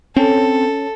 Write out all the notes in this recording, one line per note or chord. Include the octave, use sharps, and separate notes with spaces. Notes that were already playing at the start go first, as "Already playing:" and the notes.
C4 C#4 A4